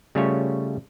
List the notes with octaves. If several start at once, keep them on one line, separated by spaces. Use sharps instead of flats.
C#3 G3 A3 C#4 F4 C#5